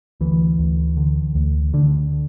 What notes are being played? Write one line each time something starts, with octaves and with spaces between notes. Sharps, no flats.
D2 E3
D2
D3
D2
D2 D3